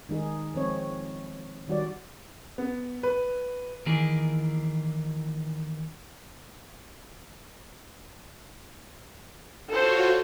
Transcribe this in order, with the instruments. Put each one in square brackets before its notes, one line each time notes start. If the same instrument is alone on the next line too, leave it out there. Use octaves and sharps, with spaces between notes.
[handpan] D#3 G#3 D#4 G#4
F3 G#3 C4 C#5
D#3 G3 F#4 C#5 D5
[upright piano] B3
B4
[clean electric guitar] D#3 E3 A#3 G#4
[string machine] F4 F#4 C#5 [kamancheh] A4 C5